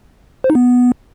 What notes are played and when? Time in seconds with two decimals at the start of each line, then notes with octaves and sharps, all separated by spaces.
0.44 C5
0.50 D#4
0.55 B3